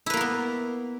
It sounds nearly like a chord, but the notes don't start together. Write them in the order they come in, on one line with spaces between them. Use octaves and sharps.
E4 B4 A#3 A#4 B3